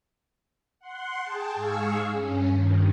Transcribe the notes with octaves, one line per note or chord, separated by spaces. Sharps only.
F#5 C6
G#4 G5 A5
G#2 G#4 F5 C#6 E6
G2 C#4
G2 D#3